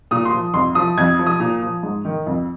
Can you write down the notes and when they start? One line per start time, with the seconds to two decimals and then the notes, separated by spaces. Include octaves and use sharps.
0.11 A#2 D#6
0.25 C6
0.33 F3
0.54 F2 C6
0.75 F3 D#6
0.98 F2 G#6
1.19 F3
1.26 D#6
1.40 A#2
1.62 F3
1.83 G#2
2.05 D#3
2.26 F2